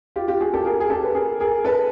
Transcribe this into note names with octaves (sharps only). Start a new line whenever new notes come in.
F4 G4
F4 G4
F#4 G#4
G4 A4
G#4 A#4
G#4
G4 A4
B4
G#4 A#4
G#4 A#4
A4 B4